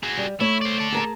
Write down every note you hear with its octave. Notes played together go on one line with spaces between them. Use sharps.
F#4 G#4
G3
A3 E4 C#5
C5 D5
A4 D5
G#4 A#4 A5